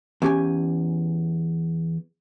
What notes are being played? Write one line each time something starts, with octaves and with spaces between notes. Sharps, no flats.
E2 C#4 G4 G#5